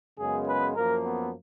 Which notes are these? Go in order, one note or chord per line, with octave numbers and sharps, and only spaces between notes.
F#2 C#3 G#3 B3 G#4
B4
F#2 F3 A#3 A#4
B3